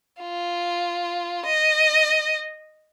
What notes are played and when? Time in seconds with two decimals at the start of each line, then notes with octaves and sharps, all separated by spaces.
0.21 F4
1.46 D#5